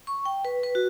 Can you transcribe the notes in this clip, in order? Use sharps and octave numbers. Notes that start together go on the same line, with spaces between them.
C#6
G5
B4
B4
F#4